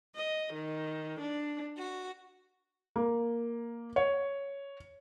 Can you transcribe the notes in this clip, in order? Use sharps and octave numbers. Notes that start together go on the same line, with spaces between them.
D#5
D#3
D4
F#4
A#3
C#5